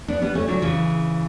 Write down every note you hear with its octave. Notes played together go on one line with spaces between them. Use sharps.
B3 D4
G3 B3
A3 C#4
D3 F#3
C#3 E3